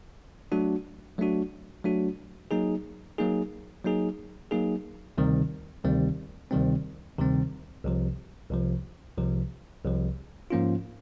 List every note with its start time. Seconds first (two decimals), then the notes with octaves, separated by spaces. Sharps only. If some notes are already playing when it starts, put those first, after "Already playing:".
0.52 F#3 A3 D4 F#4
1.18 F#3 A3 D4 F#4
1.84 F#3 A3 D4 F#4
2.51 F#3 A#3 D#4 G#4
3.18 F#3 A#3 D#4 G#4
3.85 F#3 A#3 D#4 G#4
4.51 F#3 A#3 D#4 G#4
5.18 D2 C3 D#3 G3 C4
5.84 D2 C3 D#3 G3 C4
6.51 D2 C3 D#3 G3 C4
7.18 D2 C3 D#3 G3 C4
7.84 C2 C3 F3
8.51 C2 C3 F3
9.17 C2 C3 F3
9.85 C2 C3 F3
10.50 G#2 F3 A#3 C#4 F4